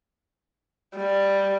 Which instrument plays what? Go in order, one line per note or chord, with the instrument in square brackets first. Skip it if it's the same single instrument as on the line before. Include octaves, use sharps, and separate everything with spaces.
[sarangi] G3